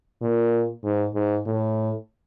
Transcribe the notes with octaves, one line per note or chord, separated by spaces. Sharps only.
A#2
G#2
G#2
A2